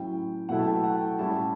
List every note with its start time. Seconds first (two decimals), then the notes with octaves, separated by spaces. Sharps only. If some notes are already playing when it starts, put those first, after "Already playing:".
Already playing: A2 F#3 C#4 E4 G5
0.49 B2 F#3 A3 E4 F#5
0.59 A5
0.66 G5
0.84 F#5
1.01 G5
1.19 A2 G3 C#4 E4 A5